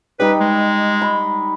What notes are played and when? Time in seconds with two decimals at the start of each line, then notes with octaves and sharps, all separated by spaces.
0.20 G3 D#4 B4
0.41 G#3
1.02 B5